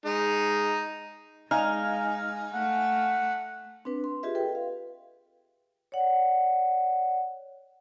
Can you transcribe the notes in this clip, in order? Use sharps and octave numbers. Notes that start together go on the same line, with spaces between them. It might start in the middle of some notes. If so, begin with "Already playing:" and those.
G#3 D#4
G#3 D#4 F5 G#5 F6
A3 F#5
C4 D4 B4
C6
F4 G4 G#4 B4 D#5 E5
A4 B4 G5
F5
C#5 D5 F#5